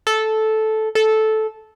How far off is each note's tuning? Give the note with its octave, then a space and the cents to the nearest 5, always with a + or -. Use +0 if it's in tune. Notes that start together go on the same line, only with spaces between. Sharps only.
A4 -10
A4 -10